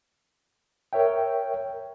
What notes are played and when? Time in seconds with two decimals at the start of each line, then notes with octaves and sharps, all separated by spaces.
0.93 A#4 C#5 E5 G5